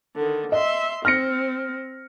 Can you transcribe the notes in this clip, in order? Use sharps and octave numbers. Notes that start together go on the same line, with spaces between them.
D3 D#3
D#5 E5 C6
C4 F6 A#6 C#7